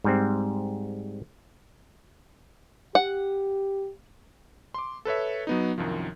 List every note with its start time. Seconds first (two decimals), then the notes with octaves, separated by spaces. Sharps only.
0.04 G#2 G3 C4
2.95 G4 F#5
4.74 C6 D6
5.05 A4 B4 C#5 E5
5.47 F#3 B3 D#4
5.78 C2 F#2 D#3 F3